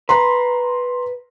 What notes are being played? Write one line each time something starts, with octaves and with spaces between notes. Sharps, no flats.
B4 A#5 C6